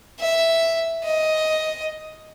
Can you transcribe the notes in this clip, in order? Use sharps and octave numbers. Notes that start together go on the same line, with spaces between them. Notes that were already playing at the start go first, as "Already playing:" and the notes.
E5
D#5